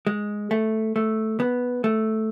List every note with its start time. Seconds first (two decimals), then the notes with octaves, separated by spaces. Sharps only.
0.07 G#3
0.51 A3
0.96 A3
1.40 B3
1.84 A3